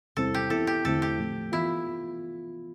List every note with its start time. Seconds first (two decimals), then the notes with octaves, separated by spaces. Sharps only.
0.17 E2 C3 G3 C4 E4 A4
0.34 G4
0.50 E3 B3 E4 A4
0.67 G4
0.84 E2 D3 A3 C4 E4 A4
1.02 G4
1.19 A2 F3 A3
1.52 E3 B3 E4 F4